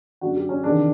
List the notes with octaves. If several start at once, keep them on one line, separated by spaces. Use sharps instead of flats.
F#2 D3 F#4
G4
C#4
E2 C3 D#3 D4